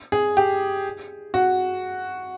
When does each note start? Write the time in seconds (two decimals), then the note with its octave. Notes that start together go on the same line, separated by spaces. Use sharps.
0.12 G#4
0.37 G4
1.34 F#4